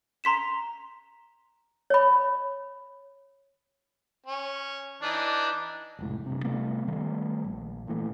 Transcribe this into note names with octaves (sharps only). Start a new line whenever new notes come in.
A#5 C6 B6 E7
C#5 B5
C#4
E3 D4 D#4
F1 C#2 A2
G2 C3
C3 G3 A3 B3
D#3 G3 A3 B3
A#1
A#2 E3 A3